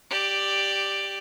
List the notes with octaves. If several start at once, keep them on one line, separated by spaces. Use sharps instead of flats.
G4 D5